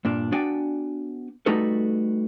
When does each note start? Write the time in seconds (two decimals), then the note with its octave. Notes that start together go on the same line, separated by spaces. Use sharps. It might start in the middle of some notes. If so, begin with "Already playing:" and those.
0.05 G2 A#2 D4
0.32 B3 D4 F#4 D5 G5 G#5
1.46 G3 A3 D#4 F#4 A4 B4